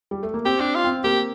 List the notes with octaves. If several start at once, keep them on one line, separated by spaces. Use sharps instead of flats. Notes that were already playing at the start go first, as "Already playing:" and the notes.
G3
A3
A#3
C4 G4
D4
F4
C4
A#3 G4